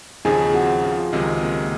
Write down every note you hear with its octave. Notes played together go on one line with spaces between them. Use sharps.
D#2 C#3 F3 C4 D#4 G#4
F#4
F4
C#2 C3 D#3 F#3 D#4
A#3